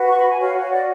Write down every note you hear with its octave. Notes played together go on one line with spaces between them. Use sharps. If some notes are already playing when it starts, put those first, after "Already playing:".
Already playing: F#4 B4
C#6
B5
G#5
F#4 C#5 F5
C#5
D5